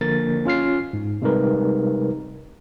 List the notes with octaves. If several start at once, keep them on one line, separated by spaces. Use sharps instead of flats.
D3 F3 A#3 A#4 A6
C#4 F4 F6 C7
G#2
C3 G3 G#3 D#4 A#4 B4